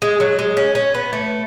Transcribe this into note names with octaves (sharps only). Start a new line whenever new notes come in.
G#3
F#3
G#3
C#4
C#4
B3
A3